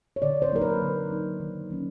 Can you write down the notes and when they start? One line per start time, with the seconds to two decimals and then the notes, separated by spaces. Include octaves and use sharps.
0.16 C#5
0.22 D3 D5
0.42 C5
0.52 F#3 A#3 D#4 A#4
0.62 B4
0.82 D3
1.11 F#3 A#3 D#4
1.40 D#3
1.70 F#3 A#3 C#4